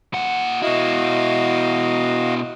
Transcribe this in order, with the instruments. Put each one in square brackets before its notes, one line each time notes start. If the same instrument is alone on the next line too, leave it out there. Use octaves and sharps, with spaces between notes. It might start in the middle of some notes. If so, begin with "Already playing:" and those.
[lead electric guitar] A#2 F#5
[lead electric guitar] B2 E4 [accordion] F#4 D#5 F5